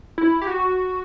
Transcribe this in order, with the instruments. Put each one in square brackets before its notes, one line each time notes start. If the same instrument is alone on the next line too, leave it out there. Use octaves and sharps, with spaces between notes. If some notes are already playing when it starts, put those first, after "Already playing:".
[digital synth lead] E4
G4
F#4